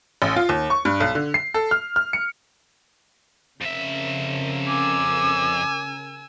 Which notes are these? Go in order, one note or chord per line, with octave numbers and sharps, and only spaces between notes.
A1
F4
D#2
C#6
G2
B1
D3
C7
A4
F6
F6
C#7
F2 C#3 A#4 E5
G#5 D6 E6